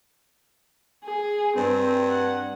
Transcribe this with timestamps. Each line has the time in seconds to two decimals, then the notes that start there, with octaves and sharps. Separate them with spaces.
1.04 G#4
1.57 G2 C4
2.09 F#5